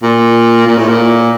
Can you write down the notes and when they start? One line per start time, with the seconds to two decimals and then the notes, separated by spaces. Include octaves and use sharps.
0.03 A#2
0.66 A#2
0.77 A2
0.88 A#2